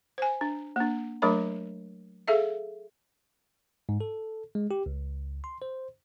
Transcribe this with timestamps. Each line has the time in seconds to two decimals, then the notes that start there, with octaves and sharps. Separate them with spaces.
0.18 C5 G#5
0.41 D4
0.76 A#3 D4
1.22 F#3 A3 D4 A#4 C#5 B5
2.28 G#4 A4 E5 F5
3.89 G#2
4.01 A4
4.55 G#3
4.71 G4
4.86 C#2
5.44 C6
5.62 C5